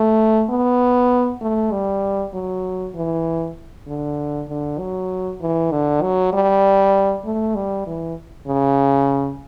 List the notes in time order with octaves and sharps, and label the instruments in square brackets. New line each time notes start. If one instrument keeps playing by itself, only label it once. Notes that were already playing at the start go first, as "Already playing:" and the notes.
Already playing: [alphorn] A3
B3
A3
G3
F#3
E3
D3
D3
F#3
E3
D3
F#3
G3
A3
G3
E3
C#3